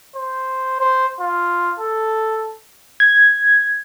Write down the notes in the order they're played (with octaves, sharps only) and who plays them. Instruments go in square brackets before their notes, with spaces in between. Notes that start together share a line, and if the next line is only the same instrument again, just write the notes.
[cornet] C5
C5
F4
A4
[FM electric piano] G#6